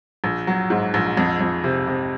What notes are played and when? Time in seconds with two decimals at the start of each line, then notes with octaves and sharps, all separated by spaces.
0.24 A#1
0.47 F#3
0.70 G#2
0.94 A#1
1.17 F2
1.41 F2
1.64 C3
1.87 C3